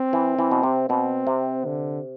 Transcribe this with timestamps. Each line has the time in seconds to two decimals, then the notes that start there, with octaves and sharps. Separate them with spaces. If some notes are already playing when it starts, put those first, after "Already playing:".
Already playing: C4
0.13 E3
0.39 E3
0.51 B2
0.63 C3
0.89 B2 C4
1.27 C3
1.65 D3